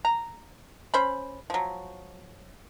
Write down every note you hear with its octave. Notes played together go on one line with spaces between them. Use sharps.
A#5
C#4 C5 B5
F3 F#3